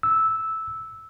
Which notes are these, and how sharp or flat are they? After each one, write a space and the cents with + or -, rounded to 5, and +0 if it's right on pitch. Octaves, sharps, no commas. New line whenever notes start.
E6 -10